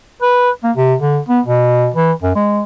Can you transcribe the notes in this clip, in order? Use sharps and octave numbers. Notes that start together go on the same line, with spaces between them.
B4
A#3
C3
D3
B3
B2
E3
F#2
G#3